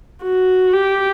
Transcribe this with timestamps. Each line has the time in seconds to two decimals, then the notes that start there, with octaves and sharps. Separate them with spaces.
0.24 F#4
0.74 G4